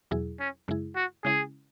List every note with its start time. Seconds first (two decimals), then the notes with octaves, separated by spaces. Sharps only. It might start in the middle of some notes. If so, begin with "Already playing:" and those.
0.11 E2 B2 F#3 E4 G#4
0.40 C#4
0.68 F#2 C#3 G#3 E4 G#4
0.96 F#4
1.25 C#3 G#3 C#4 E4 G#4